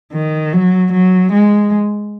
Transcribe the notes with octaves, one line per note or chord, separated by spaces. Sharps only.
D#3
F#3
F#3
G#3